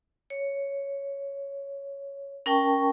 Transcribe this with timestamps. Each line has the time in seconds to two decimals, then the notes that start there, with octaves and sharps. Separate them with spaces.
0.30 C#5
2.46 C#4 A#4 G5 A5 C#6